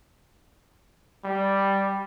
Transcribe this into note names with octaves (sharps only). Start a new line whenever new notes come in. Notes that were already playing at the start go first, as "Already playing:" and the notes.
G3